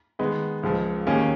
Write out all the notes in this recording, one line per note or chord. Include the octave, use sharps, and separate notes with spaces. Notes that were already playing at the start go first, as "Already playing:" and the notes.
D#3 G#3 B3 D#4
C#2 C#3 F3
D#2 D#3 A#3 C#4 G#4